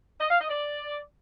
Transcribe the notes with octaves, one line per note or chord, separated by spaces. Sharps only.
D#5
F5
D#5
D5